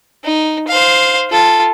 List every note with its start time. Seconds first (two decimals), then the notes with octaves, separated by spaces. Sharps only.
0.25 D#4
0.68 C5 F5
1.31 F4 A4